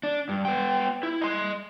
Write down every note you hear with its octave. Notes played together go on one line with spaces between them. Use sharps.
D4
G2
B3 G5
E4
D#5 C6